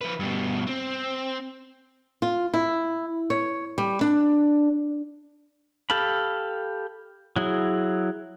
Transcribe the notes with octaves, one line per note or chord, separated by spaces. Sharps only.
F3 B4
G2 B2
C4
F4
E4
C#5
G3
D4
G4 A4 F5 A5 B5
F#3 E4 G#4